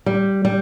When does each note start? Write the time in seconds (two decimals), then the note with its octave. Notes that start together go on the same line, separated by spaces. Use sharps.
0.06 G3
0.45 G3